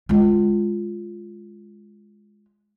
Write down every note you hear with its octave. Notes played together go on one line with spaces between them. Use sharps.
G#3 F4